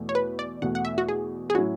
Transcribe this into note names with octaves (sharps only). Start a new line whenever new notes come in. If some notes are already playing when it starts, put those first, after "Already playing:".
Already playing: E2 B2 A3
C#5
B4
D5
E2 B2 A3 F#5
F#5
E5
F#4
G#4
G#4
A2 F#3 C#4 E4 F#4